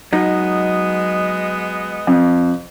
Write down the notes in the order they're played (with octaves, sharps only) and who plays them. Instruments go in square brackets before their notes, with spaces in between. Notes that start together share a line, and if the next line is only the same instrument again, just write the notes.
[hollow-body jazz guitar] F#3 D#4 [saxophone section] G#3 B3 D#5
[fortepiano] F2